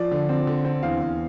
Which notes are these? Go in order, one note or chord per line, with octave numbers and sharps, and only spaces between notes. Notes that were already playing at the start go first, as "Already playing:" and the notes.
Already playing: F3 D5
D3
C4
D3
C4
E2 F5
E2